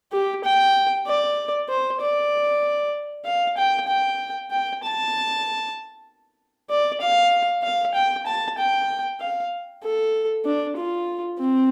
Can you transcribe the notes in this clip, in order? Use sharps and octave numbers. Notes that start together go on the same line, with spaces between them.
G4
G5
D5
C5
D5
F5
G5
G5
G5
A5
D5
F5
F5
G5
A5
G5
F5
A4
D4
F4
C4